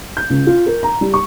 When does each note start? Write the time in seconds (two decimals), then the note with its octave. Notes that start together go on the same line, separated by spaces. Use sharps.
0.17 G6
0.30 C#2
0.47 F4
0.66 A#4
0.83 A#5
1.01 G3
1.14 C#6